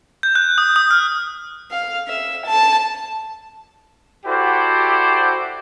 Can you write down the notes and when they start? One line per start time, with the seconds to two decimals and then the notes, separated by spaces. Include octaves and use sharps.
0.23 G6
0.35 F#6
0.58 D#6
0.76 D#6
0.91 F6
1.71 F5
2.08 E5
2.46 A5
4.26 E4 F#4 G4 A4 C5 D5